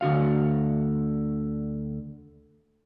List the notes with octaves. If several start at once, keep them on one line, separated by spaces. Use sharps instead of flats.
D2 D3 F#4 F5